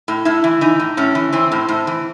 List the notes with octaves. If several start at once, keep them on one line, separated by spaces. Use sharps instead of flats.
A2
A2 E4
E3
E3 D#4
A2
A2 C#4
E3
E3 C4
A2
A2
E3